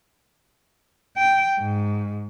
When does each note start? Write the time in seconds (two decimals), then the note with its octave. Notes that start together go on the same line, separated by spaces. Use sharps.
1.17 G5
1.58 G#2